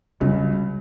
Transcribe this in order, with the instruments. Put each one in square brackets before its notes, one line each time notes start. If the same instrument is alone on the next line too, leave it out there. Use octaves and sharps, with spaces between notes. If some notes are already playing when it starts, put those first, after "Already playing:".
[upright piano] C#2 C#3 F#3 [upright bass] G3